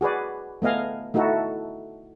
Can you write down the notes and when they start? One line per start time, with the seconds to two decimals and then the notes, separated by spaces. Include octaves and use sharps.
0.01 F#4 G#4 B4 D5
0.62 A3 B3 D#5 F5 G#5
1.14 A3 D#4 E4 F#4 A4